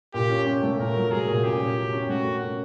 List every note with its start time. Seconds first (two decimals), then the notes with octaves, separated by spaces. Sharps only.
0.14 A#2 G4
0.30 C#4
0.46 C#4
0.63 A3
0.79 A#2 A#4
0.96 F#3
1.11 A3 G#4
1.28 A#2
1.44 C#4 G4
1.60 A#2
1.76 A#2
1.93 C#4
2.09 A3 F#4
2.25 A3
2.41 C#4